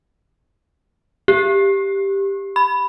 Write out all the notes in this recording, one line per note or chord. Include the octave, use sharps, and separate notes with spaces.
G4
B5